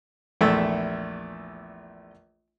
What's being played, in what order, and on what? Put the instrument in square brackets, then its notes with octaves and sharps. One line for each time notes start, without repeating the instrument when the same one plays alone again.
[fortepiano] A#1 E2 A3 E5